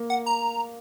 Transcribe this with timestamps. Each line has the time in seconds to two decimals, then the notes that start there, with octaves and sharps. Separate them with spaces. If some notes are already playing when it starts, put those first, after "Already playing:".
Already playing: A#3
0.10 F#5
0.26 A#5